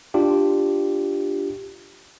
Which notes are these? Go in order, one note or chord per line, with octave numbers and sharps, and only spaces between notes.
D4 F4 G4